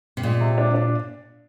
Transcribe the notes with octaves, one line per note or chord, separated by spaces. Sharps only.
C3
A#2 G#3
C3
D4
D4